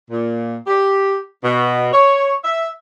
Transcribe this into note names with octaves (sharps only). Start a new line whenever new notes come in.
A#2
G4
B2
C#5
E5